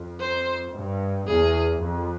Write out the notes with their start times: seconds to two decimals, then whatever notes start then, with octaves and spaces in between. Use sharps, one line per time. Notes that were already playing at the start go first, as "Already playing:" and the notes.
Already playing: F2
0.20 C5
0.75 G2
1.28 E2 G#4
1.80 F2